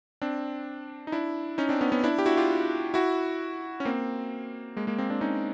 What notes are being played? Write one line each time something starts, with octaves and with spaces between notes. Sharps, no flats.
C4 D4
D#4
D4 E4
C#4 D#4
C4 D4
B3 C#4
B3 C#4
D4 E4
G4
E4 F#4
F4 G4
E4 F#4
C#4
A#3 C4
G#3 A#3
G#3 A#3
A#3 C4
C4 D4
C#4 D#4